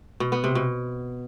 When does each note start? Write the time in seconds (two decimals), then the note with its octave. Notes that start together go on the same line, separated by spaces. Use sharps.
0.20 B2
0.32 B3
0.44 C3
0.55 B2